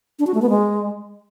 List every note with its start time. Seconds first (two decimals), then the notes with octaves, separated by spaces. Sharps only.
0.19 D4
0.27 F#4
0.34 A3
0.42 B3
0.50 G#3